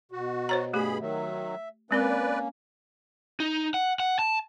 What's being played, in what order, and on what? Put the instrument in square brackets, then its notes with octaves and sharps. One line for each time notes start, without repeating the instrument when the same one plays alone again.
[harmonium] B2 [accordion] F#4
[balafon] C5 C#5 A#5
[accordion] G2 G#4 B5 [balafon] A3 G4
[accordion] D#3 F#3 [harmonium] E5
[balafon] G#3 C4 A#4 [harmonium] A#3 C#4 [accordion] B4 D5
[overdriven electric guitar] D#4
F#5
F#5
A5